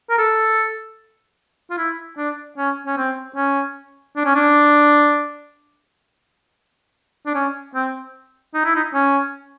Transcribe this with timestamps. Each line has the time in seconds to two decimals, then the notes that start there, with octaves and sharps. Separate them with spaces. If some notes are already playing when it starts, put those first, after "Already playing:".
0.10 A#4
0.18 A4
1.70 F4
1.77 E4
2.17 D4
2.58 C#4
2.87 C#4
2.97 C4
3.36 C#4
4.16 D4
4.25 C#4
4.36 D4
7.26 D4
7.34 C#4
7.75 C4
8.54 D#4
8.65 E4
8.76 D#4
8.94 C#4